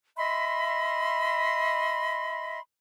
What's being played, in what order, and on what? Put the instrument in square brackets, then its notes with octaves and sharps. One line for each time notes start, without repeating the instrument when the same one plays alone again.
[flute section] D#5 E5 B5 C6